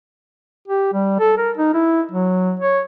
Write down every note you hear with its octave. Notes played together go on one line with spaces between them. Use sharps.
G4
G3
A4
A#4
D#4
E4
F#3
C#5